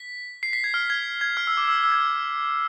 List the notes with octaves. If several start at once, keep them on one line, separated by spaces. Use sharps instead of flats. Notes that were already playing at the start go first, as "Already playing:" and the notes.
Already playing: B6
C7
B6
G#6
F6
G#6
G#6
F6
E6
D6
E6
E6
G#6